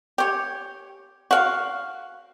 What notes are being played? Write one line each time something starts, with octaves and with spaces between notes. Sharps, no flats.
G4 C#5
F#4 F5